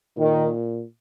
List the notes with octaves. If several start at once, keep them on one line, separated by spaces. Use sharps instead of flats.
A#2 D#3